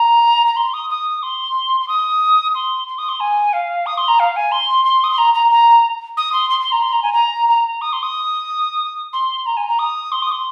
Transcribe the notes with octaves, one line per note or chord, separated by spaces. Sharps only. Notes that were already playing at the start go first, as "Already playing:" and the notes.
Already playing: A#5
A#5
C6
D#6
D#6
C6
C6
D#6
C6
C6
D#6
C6
G#5
F5
D#6
C6
A#5
F5
G#5
C6
C6
D#6
C6
A#5
A#5
A#5
D#6
C6
C6
C6
A#5
C6
A#5
G#5
A#5
A#5
D#6
C6
D#6
C6
A#5
G#5
A#5
D#6
C6
D#6
C6